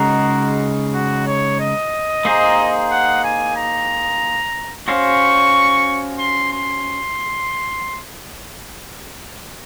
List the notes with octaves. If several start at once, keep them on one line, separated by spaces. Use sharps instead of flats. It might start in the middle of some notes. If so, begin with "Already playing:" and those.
Already playing: C#3 G#3 D#4 F#4 A#4
F#4
C#5
D#5
A#3 D#4 G#4 C5
F#5
G#5
A#5
C#4 F#4 C5 F5 C#6
C6
C6